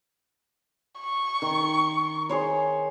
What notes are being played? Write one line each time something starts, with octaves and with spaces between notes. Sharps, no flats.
C#6
D#3
G#4 C5 C#5